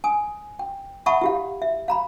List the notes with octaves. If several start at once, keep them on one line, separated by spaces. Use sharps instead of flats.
G#5 D#6
G5
E5 F#5 A5 B5 C#6 D#6
E4 G4 F5
E5
F5 A#5 B5